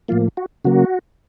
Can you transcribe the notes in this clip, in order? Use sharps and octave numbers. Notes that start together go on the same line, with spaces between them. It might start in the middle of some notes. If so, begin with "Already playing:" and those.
A2 F3 A#3 F4
F#4
C#3 F#3 A#3 F#4